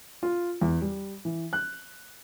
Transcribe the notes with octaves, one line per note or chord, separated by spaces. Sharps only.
F4
E2
G3
E3
F#6